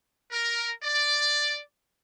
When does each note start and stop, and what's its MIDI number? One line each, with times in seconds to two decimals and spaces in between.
0.31 0.70 70
0.83 1.60 74